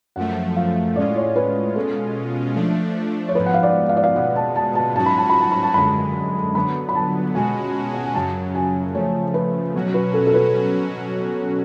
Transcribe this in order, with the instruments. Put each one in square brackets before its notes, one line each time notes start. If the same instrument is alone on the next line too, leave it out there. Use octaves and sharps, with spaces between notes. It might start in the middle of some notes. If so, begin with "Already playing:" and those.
[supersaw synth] F#2 F3 A3 [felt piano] F#5
[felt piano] F5
[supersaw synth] A2 G#3 C#4 F4 [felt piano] D5
[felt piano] C#5
B4
[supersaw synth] B2 G#3 C#4 F4 [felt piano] A4
[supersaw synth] F3 A3 D4
[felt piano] C#5
[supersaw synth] G#2 F3 B3 [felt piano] B4
[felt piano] F#5
F5
D5
F5
D5
F5
[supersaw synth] B2 G#3 B3 [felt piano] F#5
[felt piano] A5
A5
A5
[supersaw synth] G#2 F#3 C#4 F#4 [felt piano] A5
[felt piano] B5
A5
B5
A5
B5
A5
[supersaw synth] F#2 D3 G#3 [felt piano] B5
[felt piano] A5
[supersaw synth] D3 F#3 B3 [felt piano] B5
[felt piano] B5
A5
[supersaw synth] B2 G#3 C#4 F#4 [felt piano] G#5
[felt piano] F#5
G#5
[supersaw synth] F#2 C#3 F#3 [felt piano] A5
[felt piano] G#5
[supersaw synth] C#3 F3 A3 [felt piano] C#5
[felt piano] B4
[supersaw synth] B2 F#3 C#4 F#4
[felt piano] B4
A4
A4
B4